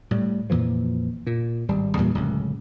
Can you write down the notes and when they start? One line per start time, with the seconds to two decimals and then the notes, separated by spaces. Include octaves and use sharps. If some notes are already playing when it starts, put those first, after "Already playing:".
0.11 A2 G3
0.50 F2 A#2 E3 F3
1.27 A#2
1.68 G#1 G3
1.97 E2 G2 A#2 G3
2.15 D1 C#2 F#2